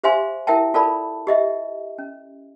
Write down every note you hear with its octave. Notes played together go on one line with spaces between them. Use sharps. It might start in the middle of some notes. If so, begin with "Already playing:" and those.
G4 C5 E5 F5 G#5 C6
E4 A#4 E5 G5 A5
F4 A4 A#4 D5 A5 B5
G4 D#5 E5
C#4